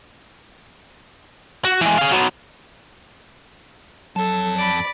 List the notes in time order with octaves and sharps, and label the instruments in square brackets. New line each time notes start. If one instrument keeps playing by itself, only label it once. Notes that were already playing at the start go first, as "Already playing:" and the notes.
[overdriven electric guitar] F#4
E3 G#3
G#4 F5
F#3 B3
[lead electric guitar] F2 A5 [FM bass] F#3 [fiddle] A4
[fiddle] D5 B5